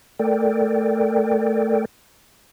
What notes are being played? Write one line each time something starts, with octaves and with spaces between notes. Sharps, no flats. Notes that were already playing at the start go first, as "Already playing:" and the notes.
A3 A4 A#4 D5 G5